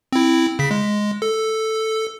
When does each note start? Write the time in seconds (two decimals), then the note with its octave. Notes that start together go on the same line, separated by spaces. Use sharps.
0.12 C4 E4
0.59 C#3 B6
0.71 G#3
1.22 A4